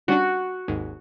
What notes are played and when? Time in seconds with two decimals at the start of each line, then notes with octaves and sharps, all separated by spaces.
0.08 G3 C#4 D4 F#4
0.68 G#1 D#2 G#2